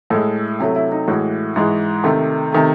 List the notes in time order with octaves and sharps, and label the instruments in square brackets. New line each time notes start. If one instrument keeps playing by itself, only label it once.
[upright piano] A2 G#3 A4
C3 F#3 A3 E4
E4
D#4
A2 E3 G#3 F#4
G#2 E3 G#3
C3 D#3 A3
C3 D#3 A3